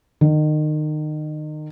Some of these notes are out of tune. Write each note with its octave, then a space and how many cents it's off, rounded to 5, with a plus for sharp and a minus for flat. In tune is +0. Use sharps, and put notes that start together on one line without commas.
D#3 -30